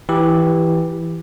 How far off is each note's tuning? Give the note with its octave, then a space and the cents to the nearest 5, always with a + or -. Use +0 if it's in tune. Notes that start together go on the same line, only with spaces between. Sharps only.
E3 +0 G4 +0